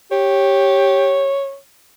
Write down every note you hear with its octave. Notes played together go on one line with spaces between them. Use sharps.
G4 C#5